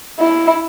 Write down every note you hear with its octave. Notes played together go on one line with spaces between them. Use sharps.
E4